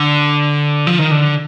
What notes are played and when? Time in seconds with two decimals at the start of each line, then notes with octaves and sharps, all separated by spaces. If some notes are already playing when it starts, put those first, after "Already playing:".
Already playing: D3
0.87 F3
0.99 D#3
1.11 D3